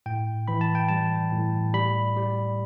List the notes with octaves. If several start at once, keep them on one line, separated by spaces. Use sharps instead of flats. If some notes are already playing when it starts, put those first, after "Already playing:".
A2 G5
E3 B5
A5
G5
G3 A5
A2
G3 B5
G3